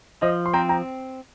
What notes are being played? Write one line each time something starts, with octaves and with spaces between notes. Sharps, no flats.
F3 C5 D#5
C6
C4 G5 A#5
G5 A#5